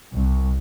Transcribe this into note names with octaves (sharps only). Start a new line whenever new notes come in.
C2